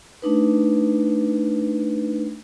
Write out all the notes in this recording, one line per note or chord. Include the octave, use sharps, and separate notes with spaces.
A3 D4 D#4 B4